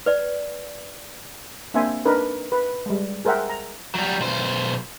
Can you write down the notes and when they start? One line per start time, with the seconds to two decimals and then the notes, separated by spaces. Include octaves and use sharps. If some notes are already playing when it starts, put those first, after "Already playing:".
0.06 B4 D5
1.74 A#3 C4 D4 C5 E5 G#5
2.06 D4 D#4 A#4 B4
2.52 B4
2.86 G3 G#3
3.25 G#4 A#4 C5 E5 F#5 G5
3.49 A#5
3.95 F#3 G3
4.20 B1 C5